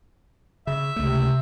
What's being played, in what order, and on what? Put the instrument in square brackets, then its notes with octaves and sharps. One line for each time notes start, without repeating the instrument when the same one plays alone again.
[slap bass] C#3 [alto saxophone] E5
[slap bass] C#2 A3 [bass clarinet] C3